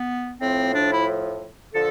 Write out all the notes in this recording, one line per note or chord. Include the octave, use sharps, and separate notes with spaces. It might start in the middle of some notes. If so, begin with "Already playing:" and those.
Already playing: B3
A2 F3 C4
D4
E4
D3 F3 A4